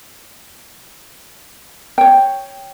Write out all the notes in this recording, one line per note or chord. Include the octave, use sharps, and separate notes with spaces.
C#5 G5